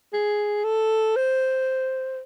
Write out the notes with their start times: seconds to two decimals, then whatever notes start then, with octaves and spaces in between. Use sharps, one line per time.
0.14 G#4
0.65 A4
1.16 C5